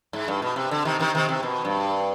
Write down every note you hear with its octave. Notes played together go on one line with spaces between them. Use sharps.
G#2
G2
B2
C3
D3
C3 D#3
C3 D#3
C3 D#3
C3
B2
G2